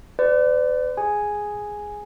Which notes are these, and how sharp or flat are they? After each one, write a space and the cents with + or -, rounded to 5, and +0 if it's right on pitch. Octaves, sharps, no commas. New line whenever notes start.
B4 +45 D5 +0
G#4 +0 G#5 +0